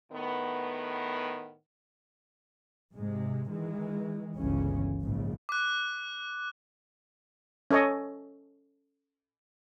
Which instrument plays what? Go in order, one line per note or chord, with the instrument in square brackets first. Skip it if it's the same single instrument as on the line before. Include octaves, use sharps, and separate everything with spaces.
[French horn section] A2 D#3 B3
[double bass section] G#2 C3 G#3
D#3 E3 G#3
G1 C#2 C#3 E3 C#4
A#1 G#2 C#3
[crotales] D6 F#6
[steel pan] C#4 A4 C#5 D#5